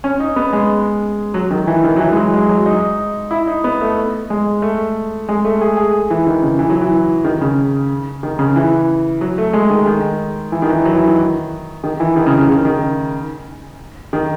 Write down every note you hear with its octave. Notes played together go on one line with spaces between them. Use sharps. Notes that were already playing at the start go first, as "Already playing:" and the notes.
C#4
D#4
B3
G#3
F#3
D#3
E3
D#3
F#3
E3
G#3
F#3
G#3
F#3
D#4
E4
D#4
B3
A3
G#3
A3
G#3
A3
G#4
G#4
E3
D#3
C#3
E3
F#3
E3
D#3
C#3
D#3
C#3
E3
F#3
A3
G#3
D#3
D#3
E3
D#3
E3
F#3
E3
D#3
D#3
E3
D#3
C#3
D#3
C#3
D#3
D#3